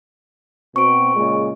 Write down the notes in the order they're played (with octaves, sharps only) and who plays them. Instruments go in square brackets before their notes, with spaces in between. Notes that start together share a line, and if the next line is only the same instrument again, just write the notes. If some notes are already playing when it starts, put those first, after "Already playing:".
[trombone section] B2 C4 [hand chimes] C#6 D7
[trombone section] A#2 C#3 G#3